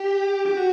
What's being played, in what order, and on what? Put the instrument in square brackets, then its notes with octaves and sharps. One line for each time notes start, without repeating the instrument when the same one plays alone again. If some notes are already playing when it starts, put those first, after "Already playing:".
Already playing: [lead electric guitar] G4
G4
F#4